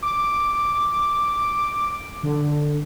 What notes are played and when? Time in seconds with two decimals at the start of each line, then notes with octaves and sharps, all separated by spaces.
0.02 D6
2.23 D3